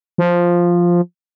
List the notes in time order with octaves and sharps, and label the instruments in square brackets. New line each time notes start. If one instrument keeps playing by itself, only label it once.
[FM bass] F3